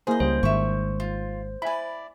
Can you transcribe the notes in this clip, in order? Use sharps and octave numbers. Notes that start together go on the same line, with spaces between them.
A#3 E4 G#4 C5 D#5
C#2 G3 C#4 C5
G#1 G#2 D#3 E5 C#6
F4
E4 D5 G#5 B5